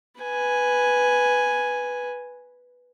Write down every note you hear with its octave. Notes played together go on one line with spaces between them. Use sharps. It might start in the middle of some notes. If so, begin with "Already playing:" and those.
B4 G#5